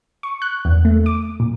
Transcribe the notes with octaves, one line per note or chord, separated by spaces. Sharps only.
C#6
F#6
E2
A3
D6
A#2